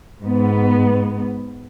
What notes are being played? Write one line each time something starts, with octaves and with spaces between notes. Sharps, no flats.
G#2 B3